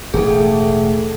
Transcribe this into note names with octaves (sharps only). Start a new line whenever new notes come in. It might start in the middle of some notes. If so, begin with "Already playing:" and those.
E1 A2 D#3 A3 G#4 A4